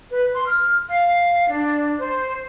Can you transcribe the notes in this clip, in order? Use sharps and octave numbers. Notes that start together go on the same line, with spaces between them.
B4
C6
F6
F5
D4
C5